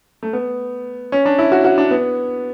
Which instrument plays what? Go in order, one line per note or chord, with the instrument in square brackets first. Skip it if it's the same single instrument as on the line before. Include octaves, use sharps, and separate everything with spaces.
[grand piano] A3
B3
C#4
D4
E4
F#4
F#4
D4
B3